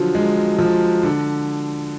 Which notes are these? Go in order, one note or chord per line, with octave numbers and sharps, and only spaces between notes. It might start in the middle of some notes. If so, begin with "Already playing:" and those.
Already playing: D3 F3 F#3
G#3
F3
D3